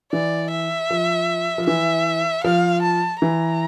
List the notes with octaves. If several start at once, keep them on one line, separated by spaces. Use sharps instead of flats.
E3 D5
E5
F3
F3
E3 E5
F3 F5
A5
E3 A#5